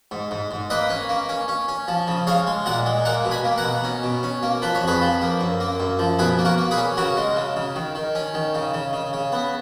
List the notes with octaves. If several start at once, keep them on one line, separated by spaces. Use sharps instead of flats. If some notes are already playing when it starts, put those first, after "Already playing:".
G#2
G#2
G#2
A#3 B4 D#5
C#4
A#3
C#4
C#4
C#4
F3
C#3
G#3 C#5 F5
G#3
A#2 F#5 A#5
G#3
A#3 F#5 A#5
B2
G#5 B5
A#3
F#5 A#5
B2
C#4
B2
C#4
A#3
F3 B4
C#5
F2
G#4 B4
F3
A#3
F#2
A#3
F#2
F3
B2 G#4 B4
A#3
F#4 A#4
A#3
G#4 B4
C#4
C#3 F#4 A#4
G#3
C#3
C#3
D#3
D#3
C#4
D#3
C#3
C#3
C#3
C#3
B3